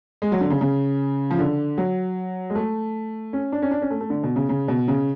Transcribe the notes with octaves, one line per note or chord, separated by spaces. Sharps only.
G#3
F#3
D3
C#3
C#3
F3
D3
F#3
G#3
A3
C#4
D4
C#4
D4
C#4
A3
A3
D3
B2
C#3
C#3
B2
C#3